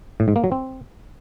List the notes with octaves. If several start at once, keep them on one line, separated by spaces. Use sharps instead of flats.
A2
G#2
A#3
F#3
C4